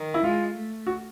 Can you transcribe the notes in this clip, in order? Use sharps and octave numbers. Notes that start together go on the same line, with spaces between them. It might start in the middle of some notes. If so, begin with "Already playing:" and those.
Already playing: D#3
E4
G#3 F4
A3
F#4